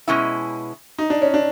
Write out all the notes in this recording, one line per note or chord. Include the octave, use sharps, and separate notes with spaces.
B2 G#3 C#4 E4
D#4
D4
C#4
D4